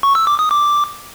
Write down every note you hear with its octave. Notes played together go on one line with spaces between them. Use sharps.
C#6
E6
D6
D#6
D6